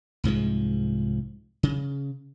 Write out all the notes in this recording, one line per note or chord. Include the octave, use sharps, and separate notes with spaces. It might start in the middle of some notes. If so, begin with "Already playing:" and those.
C2 G#2 F3 G#3
C#3